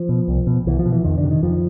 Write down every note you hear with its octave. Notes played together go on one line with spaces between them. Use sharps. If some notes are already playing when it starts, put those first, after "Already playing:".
Already playing: F3
B2
C2
B2
C2 E3
F3
B2
E3
F2 D#3
D3
C3
D#3
F2 F3